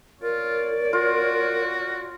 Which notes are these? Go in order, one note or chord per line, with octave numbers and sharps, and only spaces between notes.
F4 A#4 C#5 D5
F4 F#4